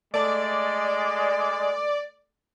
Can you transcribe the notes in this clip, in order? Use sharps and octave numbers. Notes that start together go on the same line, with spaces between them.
G#3 A3 A4 D5 A5